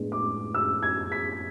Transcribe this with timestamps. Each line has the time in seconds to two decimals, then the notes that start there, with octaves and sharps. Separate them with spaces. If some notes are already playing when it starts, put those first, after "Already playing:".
Already playing: A2 G#3 B3 D4
0.12 D6
0.55 E6
0.83 G#6
1.12 B6